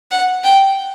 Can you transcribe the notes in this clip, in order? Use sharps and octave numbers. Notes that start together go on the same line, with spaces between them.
F#5
G5